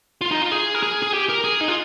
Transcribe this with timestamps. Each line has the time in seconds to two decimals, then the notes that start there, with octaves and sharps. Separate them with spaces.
0.21 F4
0.32 D#4
0.42 F4
0.52 G#4
0.74 A#4
0.83 G#4
1.03 G#4
1.14 G4
1.29 A#4
1.44 G#4
1.61 D#4
1.68 F4